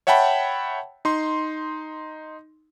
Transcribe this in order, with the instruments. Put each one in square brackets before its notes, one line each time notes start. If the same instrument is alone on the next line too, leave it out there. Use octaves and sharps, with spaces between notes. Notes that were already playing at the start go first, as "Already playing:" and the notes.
[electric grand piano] C#5 E5 F#5 G5 A5 B5
D#4 C6